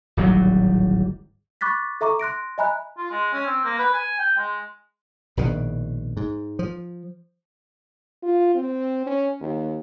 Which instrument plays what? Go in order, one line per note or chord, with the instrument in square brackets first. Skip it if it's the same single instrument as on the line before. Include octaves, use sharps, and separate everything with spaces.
[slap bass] D1 G#1 F#3 G3
[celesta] B5 C#6 D6 F#6 A6 B6
A4 E5 A#5 C#6 D6
C6 F#6 A#6 D7
D#5 E5 G#5 A#5 B5 F#6
[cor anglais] F4
G#3
C#4
C4
A#3
B4
G#5
G5
G#3
[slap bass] A#1 G#2 B2 D#3
G#2
F3
[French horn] F4
C4
C#4
D#2